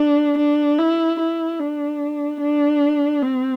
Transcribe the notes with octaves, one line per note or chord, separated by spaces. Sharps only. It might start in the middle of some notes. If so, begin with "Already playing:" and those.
Already playing: D4
D4
E4
E4
D4
D4
C4